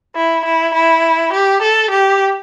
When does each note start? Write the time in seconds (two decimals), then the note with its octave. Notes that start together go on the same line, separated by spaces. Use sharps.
0.16 E4
0.45 E4
0.74 E4
1.33 G4
1.62 A4
1.91 G4